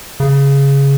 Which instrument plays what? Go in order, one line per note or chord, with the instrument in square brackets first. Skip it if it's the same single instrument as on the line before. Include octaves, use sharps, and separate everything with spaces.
[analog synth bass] C#3